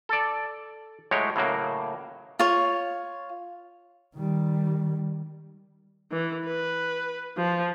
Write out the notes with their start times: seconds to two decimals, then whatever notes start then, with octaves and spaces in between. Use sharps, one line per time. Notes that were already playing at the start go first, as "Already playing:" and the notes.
0.09 A4 D5
1.11 A2 F#3 G#3 G4 C#5
1.36 A2 C#3 F#3 A#3
2.39 F4 C#5
4.15 D#3 G3
6.12 E3
6.46 B4
7.38 F3